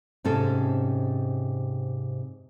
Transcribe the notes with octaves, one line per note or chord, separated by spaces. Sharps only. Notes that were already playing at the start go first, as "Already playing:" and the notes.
G#2 C3 C#4 A4